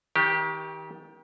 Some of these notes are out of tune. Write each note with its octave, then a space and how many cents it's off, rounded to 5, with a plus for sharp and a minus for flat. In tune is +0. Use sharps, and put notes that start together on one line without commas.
D#3 +35 G4 +0